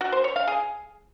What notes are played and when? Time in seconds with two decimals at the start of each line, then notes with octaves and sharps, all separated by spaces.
0.01 F#4
0.12 C5
0.24 C#5
0.36 F5
0.48 G#4